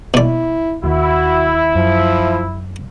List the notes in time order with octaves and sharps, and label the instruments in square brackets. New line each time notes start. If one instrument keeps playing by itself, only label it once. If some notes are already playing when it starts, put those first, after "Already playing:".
[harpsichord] B2 D5 [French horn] E4
[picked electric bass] D#2 D#3 [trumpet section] E4 [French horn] F#4
[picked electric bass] F#2 [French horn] F3